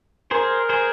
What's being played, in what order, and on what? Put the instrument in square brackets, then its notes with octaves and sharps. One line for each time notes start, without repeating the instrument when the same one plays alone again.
[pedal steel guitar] G#4 C5 [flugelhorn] A#4
[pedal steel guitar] G#4 C5